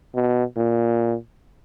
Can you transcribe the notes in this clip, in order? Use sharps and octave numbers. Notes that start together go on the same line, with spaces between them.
B2
A#2